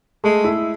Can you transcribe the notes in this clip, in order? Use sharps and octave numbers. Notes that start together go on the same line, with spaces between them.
G#3 A3
E4